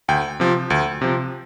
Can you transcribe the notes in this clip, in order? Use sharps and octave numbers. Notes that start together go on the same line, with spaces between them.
D2 G5
C3 F3
D2
C3 F3